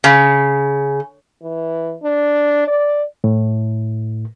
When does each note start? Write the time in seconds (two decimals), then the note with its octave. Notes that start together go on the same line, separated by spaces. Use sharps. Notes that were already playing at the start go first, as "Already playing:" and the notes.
0.04 C#3
1.42 E3
2.03 D4
2.67 D5
3.24 A2